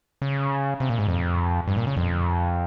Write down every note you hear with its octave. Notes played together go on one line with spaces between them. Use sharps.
C#3
C3
A#2
G#2
F2
G2
A#2
C#3
F2